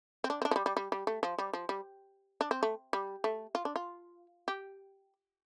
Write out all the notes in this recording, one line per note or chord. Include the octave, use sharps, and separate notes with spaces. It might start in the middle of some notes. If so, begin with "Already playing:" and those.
C4
D4
C4
D4
F3
G3
G3
G3
G3
A3
F3
G3
F3
G3
D4
C4
A3
G3
A3
F4
D4
F4
G4